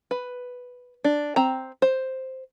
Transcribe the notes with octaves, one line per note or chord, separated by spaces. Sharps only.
B4
D4
C4 A#5
C5